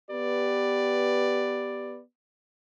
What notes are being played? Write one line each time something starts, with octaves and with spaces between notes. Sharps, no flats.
B3 G4 B4 D5